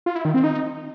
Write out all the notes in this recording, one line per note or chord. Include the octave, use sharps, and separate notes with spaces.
F4
E4
D#3
C4
D#4